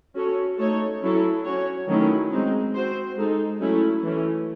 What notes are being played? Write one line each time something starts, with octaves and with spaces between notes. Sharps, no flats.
C#4 F#4 A4 C#5
A3 D#4 A4 C#5
F#3 C#4 E4 A4 C#5
C#4 F#4 C#5
D#3 F#3 A3 C#4 E4
G#3 C4 D#4
C4 F#4 C5
G#3 D#4 A4
F#3 A3 C#4 E4
E3 A3 C#4